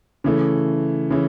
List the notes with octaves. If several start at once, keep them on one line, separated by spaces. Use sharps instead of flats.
C#3 E3 A3
C#3 E3